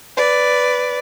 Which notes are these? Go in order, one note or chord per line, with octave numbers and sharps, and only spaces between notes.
B4 D5